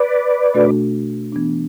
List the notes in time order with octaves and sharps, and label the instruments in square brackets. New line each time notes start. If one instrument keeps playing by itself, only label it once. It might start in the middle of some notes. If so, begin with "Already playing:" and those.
Already playing: [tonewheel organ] B4 D5
[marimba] B2 A3 D4 F#4 A4
E3 B3 D4